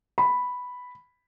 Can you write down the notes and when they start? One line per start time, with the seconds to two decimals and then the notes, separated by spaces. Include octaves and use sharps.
0.18 B5